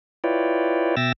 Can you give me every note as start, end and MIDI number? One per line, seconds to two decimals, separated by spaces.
0.24 0.95 64
0.24 0.95 65
0.24 0.95 71
0.24 0.95 73
0.24 0.95 74
0.24 0.95 79
0.97 1.12 47
0.97 1.12 76
0.97 1.12 79
0.97 1.12 88
0.97 1.12 93
0.97 1.12 94